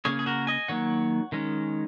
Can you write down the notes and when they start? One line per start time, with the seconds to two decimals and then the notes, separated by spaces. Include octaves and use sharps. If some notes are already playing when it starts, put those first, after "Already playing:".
0.05 C#3 A#3 C#4 G#4 C#5
0.19 G#4
0.26 F#4 A#4
0.47 D#5 G#5
0.68 D#3 F#3 A#3 C#5 F#5
1.32 D#3 G#3 C#4